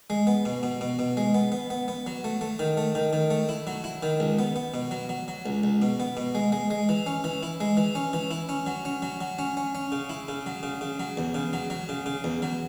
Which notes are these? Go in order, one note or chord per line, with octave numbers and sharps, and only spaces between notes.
G#3
B3
B2
B2
B2
B2
G#3
B3
B3
B3
B3
F#3
A3
A3
D#3
A3
D#3
D#3
A3
E4
F#3
E4
D#3
C#2
B3
B3
B2
F#3
F#3
F#3
C#2
C#2
B2
B3
B2
G#3
G#3
G#3
E3
C#4
E3
E4
G#3
E3
C#4
E3
E4
C#4
F#3
C#4
F#3
F#3
C#4
C#4
C#4
C#3
E4
C#3
F#3
C#3
C#3
F#3
E2
C#3
F#3
F#3
C#3
C#3
E2
F#3